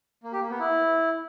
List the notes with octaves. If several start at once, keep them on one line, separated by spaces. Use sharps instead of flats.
A#3
G4
A#3
B3
E4